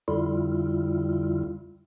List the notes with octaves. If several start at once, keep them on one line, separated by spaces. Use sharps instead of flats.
F2 D3 G3 E4 F4